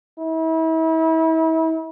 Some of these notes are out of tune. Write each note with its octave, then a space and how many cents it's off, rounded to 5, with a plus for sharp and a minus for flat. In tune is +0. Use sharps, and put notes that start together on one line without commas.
E4 -35